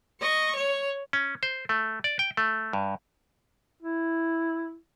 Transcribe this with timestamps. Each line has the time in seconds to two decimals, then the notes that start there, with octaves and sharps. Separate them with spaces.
0.21 D#5 C#6
0.55 C#5
1.13 C#4
1.43 C5
1.69 A3
2.04 D5
2.19 G5
2.37 A3
2.73 G2
3.83 E4